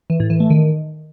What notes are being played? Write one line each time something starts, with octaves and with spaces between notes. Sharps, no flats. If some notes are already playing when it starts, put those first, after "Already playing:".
E3
A2
E3
A3
D#3